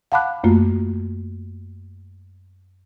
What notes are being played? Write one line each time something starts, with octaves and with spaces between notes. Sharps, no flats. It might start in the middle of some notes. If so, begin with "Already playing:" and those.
F5 F#5 A5 B5 D6 F#6
F#2 A3 A#3 F4